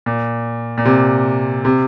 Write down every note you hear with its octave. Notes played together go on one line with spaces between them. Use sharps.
A#2
A#2
C3
C3